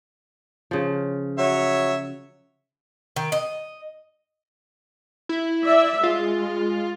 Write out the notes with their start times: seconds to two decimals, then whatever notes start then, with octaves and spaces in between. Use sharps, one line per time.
0.71 C#3 F3
1.39 F#3 C#5 E5
3.16 D#3
3.32 D#5
5.29 E4
5.64 D5 E5
6.03 G#3 F4